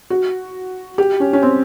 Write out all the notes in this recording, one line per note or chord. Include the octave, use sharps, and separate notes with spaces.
F#4
G4
C#4
C#4
C4